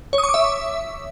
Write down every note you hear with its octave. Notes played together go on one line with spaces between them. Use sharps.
C#5
D#6
C#6
D6
E5